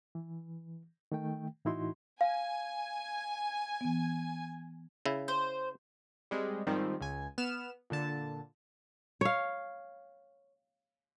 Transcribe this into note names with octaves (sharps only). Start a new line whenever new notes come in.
E3
D#3 A3 G5
A2 E3 D#4 E4 F#4 C6
F5 G#5
E3 B3
C#3 E4
C5
G3 G#3 C4
G#2 D#3 F3 G3 C4
C#2 G#5
B3 F6 E7
A#2 D3 A5
C#5 F5